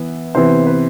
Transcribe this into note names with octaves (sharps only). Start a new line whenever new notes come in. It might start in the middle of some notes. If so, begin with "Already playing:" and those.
Already playing: E3 B3
C3 E3 B3 C5
B4